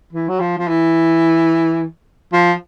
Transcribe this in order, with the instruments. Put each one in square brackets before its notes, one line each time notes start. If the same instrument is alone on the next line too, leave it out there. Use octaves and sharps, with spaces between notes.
[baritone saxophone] E3
F#3
F3
F3
E3
F3